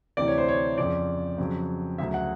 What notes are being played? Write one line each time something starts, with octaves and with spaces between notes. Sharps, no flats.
D2 C3 E3 D5
C#5
C5
C#5
F2 C#3 F3 D5
F2 C#3 F#3
D2 C#3 F#3 E5
F#5